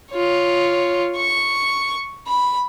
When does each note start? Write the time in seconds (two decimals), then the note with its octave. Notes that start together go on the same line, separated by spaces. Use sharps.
0.14 F4 C#5
1.16 C#6
2.27 B5